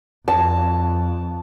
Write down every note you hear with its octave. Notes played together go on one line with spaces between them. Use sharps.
F2 A5